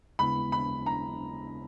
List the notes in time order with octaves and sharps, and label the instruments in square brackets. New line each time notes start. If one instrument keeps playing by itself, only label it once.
[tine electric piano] D#2 C#3 G#3 B3 E4 [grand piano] B5
[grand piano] B5
A#5